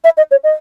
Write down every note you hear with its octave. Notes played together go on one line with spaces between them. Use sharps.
E5
D#5
C#5
D#5